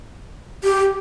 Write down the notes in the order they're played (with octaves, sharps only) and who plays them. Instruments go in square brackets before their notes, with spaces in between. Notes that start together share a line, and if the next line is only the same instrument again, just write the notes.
[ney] G4